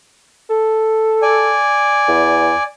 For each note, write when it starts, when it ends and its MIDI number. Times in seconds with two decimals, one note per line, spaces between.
0.50 1.57 69
1.22 2.63 74
1.22 2.63 80
2.08 2.51 40